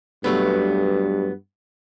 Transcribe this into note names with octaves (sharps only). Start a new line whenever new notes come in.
G2 F#3 A3 B3